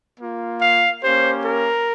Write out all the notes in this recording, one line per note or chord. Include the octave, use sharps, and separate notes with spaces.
A#3 F4
F5
A#3 C#4 G4 C5
A#4